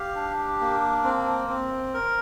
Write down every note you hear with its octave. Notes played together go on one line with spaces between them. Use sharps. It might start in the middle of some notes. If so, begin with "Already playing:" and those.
Already playing: G4 F5
D4
A#3
C4
C4
A#4